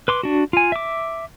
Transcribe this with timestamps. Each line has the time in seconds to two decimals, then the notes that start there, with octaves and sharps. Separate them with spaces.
0.08 B4 C6 D6
0.23 D4 F#4
0.53 F4 G#5
0.72 E5 D6